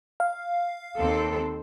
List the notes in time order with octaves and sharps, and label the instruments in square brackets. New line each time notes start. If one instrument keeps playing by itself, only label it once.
[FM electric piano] F5
[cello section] D#2 C4 A4